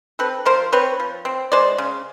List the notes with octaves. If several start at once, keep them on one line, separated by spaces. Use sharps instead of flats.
C4 A4 B4
F3 A#4 C5
C4 B4 C#5
F3
C4
G#3 C5 D5
C#3